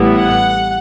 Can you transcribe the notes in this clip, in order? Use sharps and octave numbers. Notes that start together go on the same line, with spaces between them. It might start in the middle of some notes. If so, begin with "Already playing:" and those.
Already playing: A1 A2 G3 B3 E4
F#5